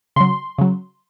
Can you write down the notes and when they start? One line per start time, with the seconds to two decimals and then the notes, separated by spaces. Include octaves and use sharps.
0.16 C#3 F#3 C6
0.58 C#3 F#3